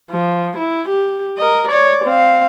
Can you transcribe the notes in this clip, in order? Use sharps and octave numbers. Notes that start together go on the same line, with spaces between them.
F3
E4
G4
A#4 D#5
C#5 D5
C4 F5